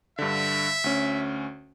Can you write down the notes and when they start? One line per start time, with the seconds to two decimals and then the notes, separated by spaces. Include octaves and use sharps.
0.19 G2 D3 E5
0.84 D2 C#4